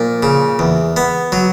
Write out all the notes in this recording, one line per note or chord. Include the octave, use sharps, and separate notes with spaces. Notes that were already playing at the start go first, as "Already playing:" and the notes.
Already playing: A#2 F3
C#3
E2
B3
F#3